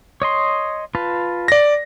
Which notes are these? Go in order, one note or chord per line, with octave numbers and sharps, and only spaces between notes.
C#5 D#5 C6
F4 B4 A5
D5 A#6